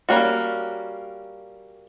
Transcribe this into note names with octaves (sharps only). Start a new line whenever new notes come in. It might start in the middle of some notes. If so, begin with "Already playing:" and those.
G3 A#3 C#4 F#4